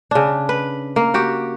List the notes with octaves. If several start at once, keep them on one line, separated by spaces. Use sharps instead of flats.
C#3 D4
B4
A#3
F#4 G4